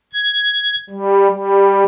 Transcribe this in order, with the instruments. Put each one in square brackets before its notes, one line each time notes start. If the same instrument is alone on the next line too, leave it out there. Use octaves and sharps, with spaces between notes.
[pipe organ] G#6
G3
G3